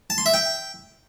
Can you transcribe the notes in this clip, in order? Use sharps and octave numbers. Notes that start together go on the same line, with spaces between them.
A5
C6
E5
G5